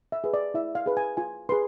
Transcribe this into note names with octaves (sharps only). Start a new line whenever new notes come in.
E5
G#4 B4
D5
E4 E5
F5
G#4 B4
G#5
F4 G#5
G#4 B4 C6